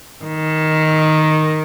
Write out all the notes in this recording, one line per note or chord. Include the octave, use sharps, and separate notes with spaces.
D#3